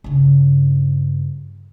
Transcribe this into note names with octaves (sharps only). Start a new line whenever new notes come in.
G2 C#3